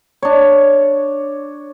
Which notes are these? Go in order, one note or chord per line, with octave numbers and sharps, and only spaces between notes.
D4 C#5